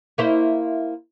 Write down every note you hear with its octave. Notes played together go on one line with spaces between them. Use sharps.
A#3 E4 C5